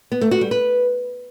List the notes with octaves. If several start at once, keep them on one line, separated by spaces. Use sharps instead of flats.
B3
A3
F#4
G3
B4